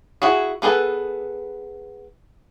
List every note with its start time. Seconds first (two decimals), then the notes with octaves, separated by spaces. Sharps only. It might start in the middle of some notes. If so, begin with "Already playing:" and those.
0.22 E4 F#4 G#4
0.62 B3 G#4 A4 B4